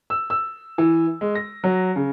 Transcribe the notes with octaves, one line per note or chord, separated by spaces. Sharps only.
E6
E6
E3
G#3
A#6
F#3
C#3